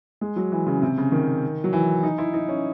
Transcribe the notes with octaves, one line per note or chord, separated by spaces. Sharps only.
G#3
F#3
E3
C#3
C3
C#3
D#3
F#3
E3
D#4
E4
D#4
C#4